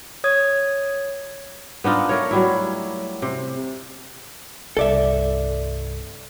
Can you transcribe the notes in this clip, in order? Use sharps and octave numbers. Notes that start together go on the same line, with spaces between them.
C#5 D#6 G#6
B3 D4 D#4 F4
A3 A#4 C#5
F#3 G3 E4
C3
C2 G2 A4 D5 E5